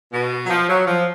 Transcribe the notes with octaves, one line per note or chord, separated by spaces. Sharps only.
B2
F#3
F3
F#3
F3